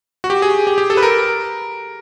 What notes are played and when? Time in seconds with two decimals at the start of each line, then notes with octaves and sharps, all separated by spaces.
0.24 F#4
0.30 G4
0.42 G#4
0.67 G4
0.78 G4
0.90 A4
0.97 B4
1.03 A#4